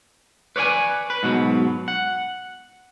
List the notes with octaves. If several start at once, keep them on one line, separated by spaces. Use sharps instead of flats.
B4 C#5 D5 F5 G#5
B4
G#2 B2 F#3
F#5